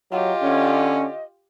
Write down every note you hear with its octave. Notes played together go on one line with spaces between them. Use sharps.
F#3 F4 G4 D#5
D3 C#4